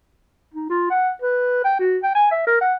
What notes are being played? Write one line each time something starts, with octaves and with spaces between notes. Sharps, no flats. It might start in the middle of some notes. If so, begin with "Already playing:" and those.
D#4
F4
F#5
B4
G5
F#4
G5
G#5
E5
A#4
F#5